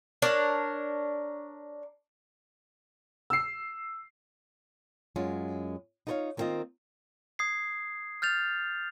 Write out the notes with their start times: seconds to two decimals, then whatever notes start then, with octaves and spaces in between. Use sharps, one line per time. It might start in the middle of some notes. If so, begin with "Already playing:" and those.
0.22 D4 A#4 C#5
3.30 E6 C7
5.16 F#2 G#3 C#4 F4
6.07 D#4 F4 A#4 C5 C#5 F5
6.37 D#3 G3 A#3 C4 F4 D#5
7.39 D#6 G#6 C7
8.22 F6 G6 A6 F7